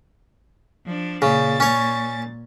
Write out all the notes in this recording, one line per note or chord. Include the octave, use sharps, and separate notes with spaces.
F3 D4
A#2 C#3 A6
C#4 C#5